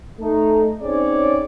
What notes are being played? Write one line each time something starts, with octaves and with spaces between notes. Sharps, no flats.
A3 D#4
C4 C#4 D#4 G#4 C#5 D5